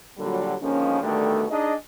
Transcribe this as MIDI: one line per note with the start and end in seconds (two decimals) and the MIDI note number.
0.18 0.54 46
0.18 0.54 50
0.18 0.54 54
0.18 0.54 55
0.62 1.01 50
0.62 1.01 51
0.62 1.01 53
0.62 1.01 56
0.62 1.01 58
0.62 1.01 61
1.02 1.45 47
1.02 1.45 50
1.02 1.45 51
1.02 1.45 55
1.02 1.45 57
1.50 1.73 62
1.50 1.73 63
1.50 1.73 68
1.50 1.73 74
1.50 1.73 75